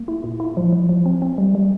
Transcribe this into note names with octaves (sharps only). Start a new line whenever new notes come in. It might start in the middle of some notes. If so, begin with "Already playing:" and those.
Already playing: A#3
E4
A#2
E4
F3
F3
F3
C4
C4
G3
G3